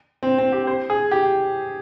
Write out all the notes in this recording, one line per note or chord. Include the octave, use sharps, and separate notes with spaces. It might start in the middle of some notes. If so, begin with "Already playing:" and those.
C4
C4
G4
C5
G#4
G4